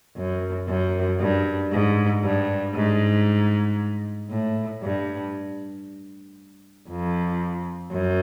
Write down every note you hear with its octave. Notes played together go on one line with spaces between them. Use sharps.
F#2
F#2
G2
G#2
G2
G#2
A2
G2
F2
F#2